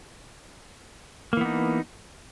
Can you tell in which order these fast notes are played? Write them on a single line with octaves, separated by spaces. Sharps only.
A#3 E3 B3 D#4